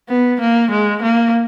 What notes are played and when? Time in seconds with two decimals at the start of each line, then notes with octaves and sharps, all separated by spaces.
0.09 B3
0.41 A#3
0.71 G#3
1.02 A#3